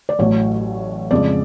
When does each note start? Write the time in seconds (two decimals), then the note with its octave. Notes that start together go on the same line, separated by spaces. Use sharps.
0.09 D5
0.19 A1 A2 F#3 A3 C#5
1.11 F2 C#3 G#3 D5